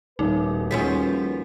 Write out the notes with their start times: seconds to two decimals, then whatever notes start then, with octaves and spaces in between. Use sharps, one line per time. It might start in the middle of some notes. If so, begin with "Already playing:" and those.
0.19 D#1 A2 D#4 F#4 B4
0.71 D#2 F3 G3 C#4 G#4 B6